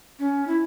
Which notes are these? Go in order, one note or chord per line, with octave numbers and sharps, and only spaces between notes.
C#4
E4